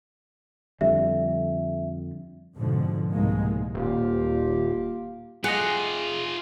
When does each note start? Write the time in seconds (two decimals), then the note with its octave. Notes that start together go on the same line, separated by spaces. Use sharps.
0.81 F2 D3 G3 E5
2.56 F2 G#2 B2 D3 F3
3.10 C2 G#2 B2 G#3 A#3
3.74 D#1 A#3 F4 G4
5.44 F4 G4 G#4 D#5 F#5